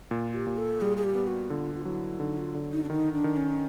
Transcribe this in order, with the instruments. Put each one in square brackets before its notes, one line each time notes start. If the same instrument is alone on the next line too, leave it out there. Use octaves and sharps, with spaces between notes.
[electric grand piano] A#2 [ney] F4
[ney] G4
[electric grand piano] A#2
[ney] A4
[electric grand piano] G3 [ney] G#4
[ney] G#4
G4
[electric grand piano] B3
[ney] F#4
[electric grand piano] D3 [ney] F4
[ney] F4
[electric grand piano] F#3 [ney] E4
[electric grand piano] D3 [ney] D#4
[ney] F4
[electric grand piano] D3
[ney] D#4
D4
[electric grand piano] D#3 [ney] D#4
[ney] D4
[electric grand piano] D#3
[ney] C#4